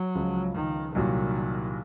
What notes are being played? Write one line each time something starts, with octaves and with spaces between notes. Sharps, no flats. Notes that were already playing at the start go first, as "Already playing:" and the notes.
Already playing: F#3
C#2 C#3 F3
D#3
C2 A#2 D#3 F#3